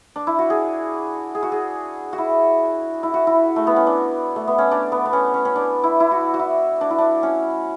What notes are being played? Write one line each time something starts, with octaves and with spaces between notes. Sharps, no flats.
D4
E4
F#4
G#4
G#4
F#4
G#4
F#4
E4
E4
F#4
E4
A3
B3
C#4
D4
A3
B3
C#4
D4
B3
B3
C#4
C#4
C#4
D4
E4
E4
F#4
F#4
E4
D4
E4
D4
C#4